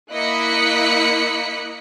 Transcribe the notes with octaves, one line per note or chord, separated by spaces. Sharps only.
A#3 E4 D#5 F#6 B6 C#7